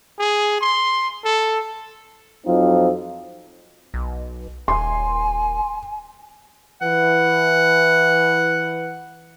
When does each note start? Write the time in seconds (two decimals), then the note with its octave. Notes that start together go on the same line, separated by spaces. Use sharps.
0.19 G#4
0.61 C6
1.25 A4
2.46 F2 F3 F#3 C4 D#4 F4
3.94 B1
4.68 D#1 G#5 C6
6.82 E3 B4 F#5